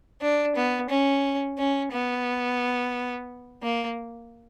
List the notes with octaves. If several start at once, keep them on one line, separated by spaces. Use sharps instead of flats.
D4
B3
C#4
C#4
B3
A#3